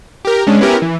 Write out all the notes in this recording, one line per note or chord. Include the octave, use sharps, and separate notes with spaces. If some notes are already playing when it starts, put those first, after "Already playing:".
G4 A#4
G#3 C#4 D4
B3 C#4 E4 G4 A#4
E3